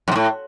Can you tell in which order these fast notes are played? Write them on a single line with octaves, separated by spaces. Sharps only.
F#2 C3 A2